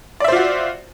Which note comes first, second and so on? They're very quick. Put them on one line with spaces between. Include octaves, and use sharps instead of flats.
D5 E5 C5 F4 F#4